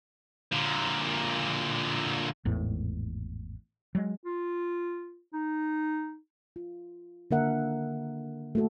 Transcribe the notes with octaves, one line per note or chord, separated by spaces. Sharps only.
A#2 D3
G#1 E2 A2
F#3 G#3
F4
D#4
F4
D3 D#3 A#3 A#4 E5 F#5
A3 A#3 F#4 A4